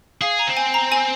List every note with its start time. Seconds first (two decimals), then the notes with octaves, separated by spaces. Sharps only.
0.21 G#4 F5
0.39 A#5
0.47 C4
0.57 G#5
0.74 A#5
0.92 G#5